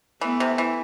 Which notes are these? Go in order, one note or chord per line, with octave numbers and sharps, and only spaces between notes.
E3 A3 B3
C3
E3